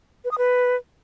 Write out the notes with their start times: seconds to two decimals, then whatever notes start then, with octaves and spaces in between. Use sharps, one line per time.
0.24 B4
0.31 D#6
0.38 B4